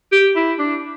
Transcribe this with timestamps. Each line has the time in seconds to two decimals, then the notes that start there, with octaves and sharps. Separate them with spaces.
0.12 G4
0.36 E4
0.59 D4